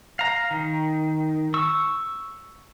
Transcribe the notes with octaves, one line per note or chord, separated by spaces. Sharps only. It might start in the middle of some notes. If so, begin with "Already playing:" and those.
F5 A#5
D#3
C#6 E6